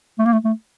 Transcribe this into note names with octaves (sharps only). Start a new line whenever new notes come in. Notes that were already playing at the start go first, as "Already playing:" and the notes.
A3
A#3
A3
A3